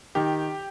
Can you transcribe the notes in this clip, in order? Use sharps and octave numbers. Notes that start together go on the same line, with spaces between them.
D#3 G4